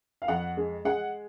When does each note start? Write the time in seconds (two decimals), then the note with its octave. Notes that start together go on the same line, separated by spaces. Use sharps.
0.22 F5
0.28 F2 F#5
0.57 G#3
0.85 G#3 F#5